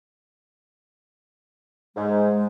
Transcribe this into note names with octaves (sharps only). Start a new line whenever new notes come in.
G#2 G#3